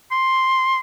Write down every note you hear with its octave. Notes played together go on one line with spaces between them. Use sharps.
C6